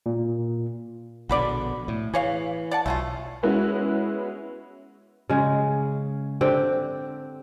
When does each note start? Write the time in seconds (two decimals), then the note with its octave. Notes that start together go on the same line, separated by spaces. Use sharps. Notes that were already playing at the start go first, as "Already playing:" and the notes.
0.06 A#2
1.29 A#1 B2 D3 F#4 B4 D5
1.88 A2
2.14 E3 G#4 C#5 F5
2.71 D5 F#5 A5
2.86 B1 A3 C#4 F4
3.43 G#3 B3 C#4 E4 F#4
5.29 C#3 G#3
6.41 D3 C4 G4